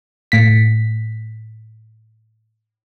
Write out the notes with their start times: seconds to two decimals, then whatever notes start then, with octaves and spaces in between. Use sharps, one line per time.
0.32 A2 B6